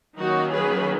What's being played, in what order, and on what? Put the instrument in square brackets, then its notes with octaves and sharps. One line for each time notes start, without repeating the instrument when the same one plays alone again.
[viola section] D#3 F#3 A#3 C#4 D#4 F#4
G#4 B4